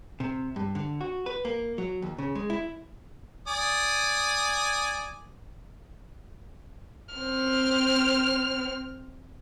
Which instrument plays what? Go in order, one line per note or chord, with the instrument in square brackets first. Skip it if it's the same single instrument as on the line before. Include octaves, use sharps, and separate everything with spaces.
[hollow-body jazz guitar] C3
G2
D3
F#4
B4
A#3
F#3
D#2
C#3
G#3
E4
[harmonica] D5 G#5 D#6
[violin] C4 F6